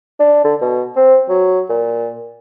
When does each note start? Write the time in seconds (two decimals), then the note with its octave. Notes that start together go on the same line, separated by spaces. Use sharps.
0.20 D4
0.44 D3
0.62 B2
0.96 C4
1.29 F#3
1.69 A#2